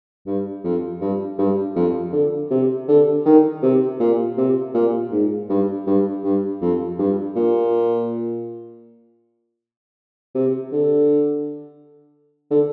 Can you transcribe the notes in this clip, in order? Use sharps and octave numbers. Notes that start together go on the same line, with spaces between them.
G2
F2
G2
G2
F2
D3
C3
D3
D#3
C3
A#2
C3
A#2
G#2
G2
G2
G2
F2
G2
A#2
C3
D3
D3